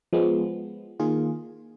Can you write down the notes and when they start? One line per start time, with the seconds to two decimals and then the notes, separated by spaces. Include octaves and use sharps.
0.13 F3 G#3 B3
1.00 D#3 A#3 F4 G#4